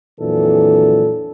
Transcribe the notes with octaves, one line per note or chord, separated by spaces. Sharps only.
F2 A#2 E3 F#3 D4 A4